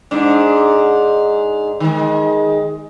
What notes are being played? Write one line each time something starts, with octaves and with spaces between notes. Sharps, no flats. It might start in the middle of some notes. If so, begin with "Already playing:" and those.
G#2 D4
D#3 G#3